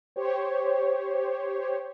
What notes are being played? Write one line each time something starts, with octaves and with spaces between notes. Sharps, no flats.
G4 C5 C#5